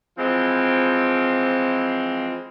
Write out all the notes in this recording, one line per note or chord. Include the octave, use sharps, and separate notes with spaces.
E3 F3 G#3 C4